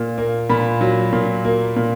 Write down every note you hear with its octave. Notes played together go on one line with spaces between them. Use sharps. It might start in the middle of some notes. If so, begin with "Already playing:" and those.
Already playing: A#2
A#3
A#2 B5
F#3
A#2
A#3
A#2